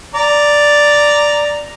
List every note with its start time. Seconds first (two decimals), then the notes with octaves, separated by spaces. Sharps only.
0.15 D5 A#5